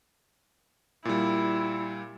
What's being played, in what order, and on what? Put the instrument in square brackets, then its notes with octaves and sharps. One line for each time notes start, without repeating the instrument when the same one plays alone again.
[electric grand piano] A#2 G3 [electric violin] E4